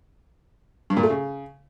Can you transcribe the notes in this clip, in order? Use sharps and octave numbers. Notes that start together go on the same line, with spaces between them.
G2
A#2
A3
C#3